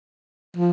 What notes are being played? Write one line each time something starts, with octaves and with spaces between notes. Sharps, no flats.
F3